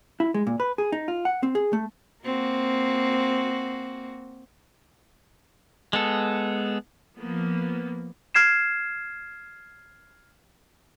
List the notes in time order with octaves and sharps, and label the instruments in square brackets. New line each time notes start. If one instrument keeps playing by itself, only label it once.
[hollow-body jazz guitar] E4
G#3
A#2
B4
G#4
D#4
F4
F#5
C4
G#4
A3
[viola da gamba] A#3 C4 F#4
[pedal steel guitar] G#3 B3 A4
[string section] F3 A#3 B3
[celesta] F6 G#6 C7 E7